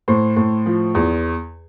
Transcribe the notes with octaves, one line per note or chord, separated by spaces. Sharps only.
A2 C5
A2
F3
E2